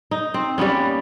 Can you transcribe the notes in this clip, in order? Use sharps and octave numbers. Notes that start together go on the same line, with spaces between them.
D#4
C4
G3 A#3 B3 C#4